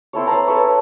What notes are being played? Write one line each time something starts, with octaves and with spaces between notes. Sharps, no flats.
C4 E4 A4 C#5
B4 A5 A#5 C6
A4 B4 C#5